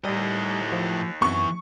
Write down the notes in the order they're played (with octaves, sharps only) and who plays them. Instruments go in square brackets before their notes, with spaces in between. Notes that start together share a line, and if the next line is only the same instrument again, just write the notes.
[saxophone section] D#2 [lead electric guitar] A2 D#5 [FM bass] G3
[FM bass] F3
[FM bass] F#2 [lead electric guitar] E3 B3 [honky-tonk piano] C#6